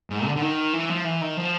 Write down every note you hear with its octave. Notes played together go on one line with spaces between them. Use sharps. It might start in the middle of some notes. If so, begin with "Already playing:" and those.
G#2
D3
D3
D#3
E3
F3
E3
D#3
F3